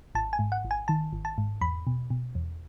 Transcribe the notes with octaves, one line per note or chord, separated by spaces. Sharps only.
G#1 A5
G#5
G#2
F#5
G#1
G#5
D#3 A5
G#1
A5
G#2
E2 B5
B2
B2
E2